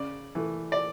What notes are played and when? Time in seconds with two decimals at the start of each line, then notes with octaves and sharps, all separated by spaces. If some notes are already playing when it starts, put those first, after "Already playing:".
Already playing: C#3 D5
0.35 E3 A3
0.72 D5